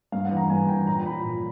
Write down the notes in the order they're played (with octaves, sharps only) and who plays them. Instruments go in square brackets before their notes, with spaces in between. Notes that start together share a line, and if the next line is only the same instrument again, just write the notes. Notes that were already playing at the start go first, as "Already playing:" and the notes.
[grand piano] G2 F5
F#5
E3
A#5
G2 G#5
E3 G5
A#2 A#5
F3 B5
A#2